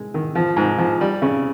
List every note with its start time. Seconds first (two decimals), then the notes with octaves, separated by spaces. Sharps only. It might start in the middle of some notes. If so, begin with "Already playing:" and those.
Already playing: G#3
0.14 D#3
0.35 F3
0.57 G#2
0.78 F3
1.01 G3
1.22 C#3